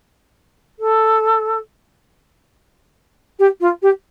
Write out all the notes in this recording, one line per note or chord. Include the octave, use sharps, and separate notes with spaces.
A4
G4
F4
G4